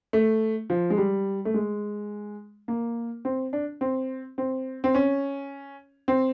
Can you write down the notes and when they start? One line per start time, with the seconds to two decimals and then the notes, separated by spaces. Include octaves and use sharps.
0.13 A3
0.70 F3
0.90 G#3
0.98 G3
1.45 A3
1.54 G#3
2.68 A#3
3.25 C4
3.53 D4
3.81 C4
4.38 C4
4.84 C4
4.95 C#4
6.08 C4